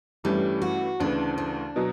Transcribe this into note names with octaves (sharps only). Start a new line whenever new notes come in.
G2 E3 G3 A3 C#4
F#4
D2 C#3 E3 D4
D4
B2 F#3